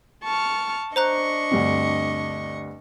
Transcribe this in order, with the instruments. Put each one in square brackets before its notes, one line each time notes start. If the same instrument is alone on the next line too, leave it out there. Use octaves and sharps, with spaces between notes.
[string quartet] A5 C#6 F6
[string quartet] D4 D#5 C#6 [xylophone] C5 A#5 F#6
[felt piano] D2 G2 C4